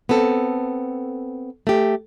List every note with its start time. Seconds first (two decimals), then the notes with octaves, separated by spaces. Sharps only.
0.09 B3 C4 A4
1.67 A3 G4